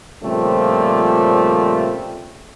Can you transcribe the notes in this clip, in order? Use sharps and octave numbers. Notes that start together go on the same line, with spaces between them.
A#2 C#3 F3 G3 A3 C4